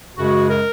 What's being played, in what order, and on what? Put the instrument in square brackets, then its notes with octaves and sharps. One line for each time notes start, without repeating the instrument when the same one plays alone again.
[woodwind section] F#2 C#3 G#3 F#4
A#4